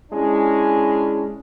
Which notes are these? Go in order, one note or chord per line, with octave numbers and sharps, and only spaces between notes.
G#3 C#4 D4 E4